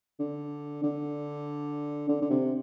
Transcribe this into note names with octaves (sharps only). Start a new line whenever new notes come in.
D3
D3
D3
D3
C3